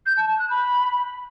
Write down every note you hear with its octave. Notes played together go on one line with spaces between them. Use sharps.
G6
A5
A5
F#6
B5